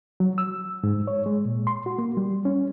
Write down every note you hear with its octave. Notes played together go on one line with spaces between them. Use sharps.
F#3
E6
G#2
C#5
G#3
A#2
C6
F#4
A#3
G3
C#4